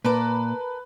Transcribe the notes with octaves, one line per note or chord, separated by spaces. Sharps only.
A#2 A#4 B4 A5 D6